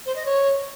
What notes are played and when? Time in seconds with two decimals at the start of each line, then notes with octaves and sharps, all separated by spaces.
0.05 C5
0.15 D#5
0.25 C#5